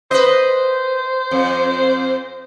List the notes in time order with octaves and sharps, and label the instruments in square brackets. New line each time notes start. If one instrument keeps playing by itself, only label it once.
[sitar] B4 D#5 [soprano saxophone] C5
[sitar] F2